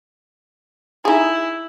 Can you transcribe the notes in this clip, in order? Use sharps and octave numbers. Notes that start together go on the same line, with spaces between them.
D#4 E4 G#4